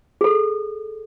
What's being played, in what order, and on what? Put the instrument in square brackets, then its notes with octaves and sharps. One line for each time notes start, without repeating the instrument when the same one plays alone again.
[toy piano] G#4 A4